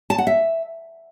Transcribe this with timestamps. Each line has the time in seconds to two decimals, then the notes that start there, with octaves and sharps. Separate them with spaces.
0.10 A5
0.18 F#5
0.27 E5